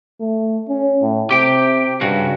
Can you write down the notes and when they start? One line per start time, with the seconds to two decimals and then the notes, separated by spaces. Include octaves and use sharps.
0.20 A3
0.69 C#4
1.02 A2
1.31 C3 G4 G5
2.01 G2 C#3 F#4